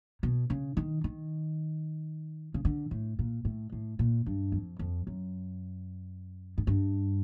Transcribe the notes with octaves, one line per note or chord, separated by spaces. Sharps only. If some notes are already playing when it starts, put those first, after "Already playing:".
B2
C#3
D#3
D#3
C#3
D3
A2
A#2
A2
A2
A#2
G2
F2
F2
F#2
G#2
G2